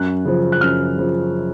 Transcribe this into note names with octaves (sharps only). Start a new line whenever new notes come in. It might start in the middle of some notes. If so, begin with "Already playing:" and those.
Already playing: F#2 F#6
C#3 F3
F#6
F#2 F6
C#3 F3